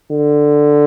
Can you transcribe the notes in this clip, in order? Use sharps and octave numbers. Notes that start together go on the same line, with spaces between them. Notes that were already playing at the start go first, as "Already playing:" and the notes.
D3